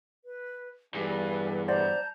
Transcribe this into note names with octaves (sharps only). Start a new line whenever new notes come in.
B4
E2 G2 A4 B4 G#5
C5 D5 F#5 A5 A#5 G6